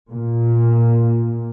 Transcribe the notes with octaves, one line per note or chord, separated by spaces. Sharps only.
A#2